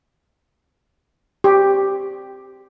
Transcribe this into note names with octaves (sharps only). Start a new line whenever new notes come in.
G4